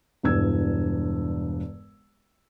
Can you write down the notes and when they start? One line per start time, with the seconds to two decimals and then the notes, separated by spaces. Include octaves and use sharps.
0.23 E1 G2 E3 E6 G#6